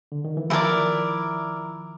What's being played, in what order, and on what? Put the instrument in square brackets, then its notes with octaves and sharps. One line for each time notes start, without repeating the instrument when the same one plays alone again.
[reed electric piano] D3
D#3
E3
[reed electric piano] D#3 F3 [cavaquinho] E4 G4 A#4 D5